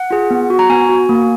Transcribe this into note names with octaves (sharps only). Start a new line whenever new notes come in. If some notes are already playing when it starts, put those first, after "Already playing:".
Already playing: F#5
F4 G#4
B3
F#4
A#5
B3 G#5
F#4
A#3